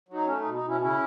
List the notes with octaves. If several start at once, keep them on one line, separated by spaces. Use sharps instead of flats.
F#3 D#4
A3 C#4
D#4
B2
D#4
B2 C#4 E4
C#3 C#4 E4